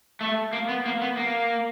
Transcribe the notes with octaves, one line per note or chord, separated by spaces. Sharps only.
A3
A#3
B3
A#3
B3
A#3